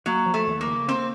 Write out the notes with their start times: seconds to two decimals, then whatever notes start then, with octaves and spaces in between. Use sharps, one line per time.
0.06 F#3 A#3
0.26 F3
0.34 A3
0.47 D#2
0.61 A#3
0.67 C#3
0.88 A#3 C4